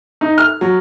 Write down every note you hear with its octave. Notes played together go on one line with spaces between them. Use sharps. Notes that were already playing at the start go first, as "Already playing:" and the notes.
D#4
F6
F#3